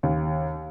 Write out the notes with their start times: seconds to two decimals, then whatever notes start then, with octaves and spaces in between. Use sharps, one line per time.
0.03 D#2